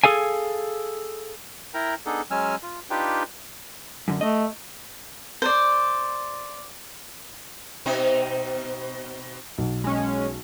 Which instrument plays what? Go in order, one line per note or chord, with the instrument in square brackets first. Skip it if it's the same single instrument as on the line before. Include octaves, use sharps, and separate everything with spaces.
[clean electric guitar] G#4 A4 F5 G#5
[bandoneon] E4 A#4 G5 A#5
B3 D4 D#4 G#4 A4
F#3 G#3 C#4 G#5 E6 F6
F4
D4 D#4 F4 G4 B4 G5
[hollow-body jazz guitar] F#2 D3
[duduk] A3 [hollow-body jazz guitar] D#5
[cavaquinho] C5 D5
[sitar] B2 C4 D#4
[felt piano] B1
[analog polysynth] G#3 C#4